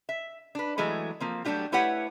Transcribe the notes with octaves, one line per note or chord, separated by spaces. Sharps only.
E5
D4 B4
E3 F#3 G#3 A3
F3 A#3 C4
F#3 G3 A3 D4 F4 G4
A3 E4 G4 B4 C#5 F#5